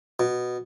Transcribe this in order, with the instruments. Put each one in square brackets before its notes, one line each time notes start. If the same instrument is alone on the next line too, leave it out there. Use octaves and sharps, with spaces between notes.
[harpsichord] B2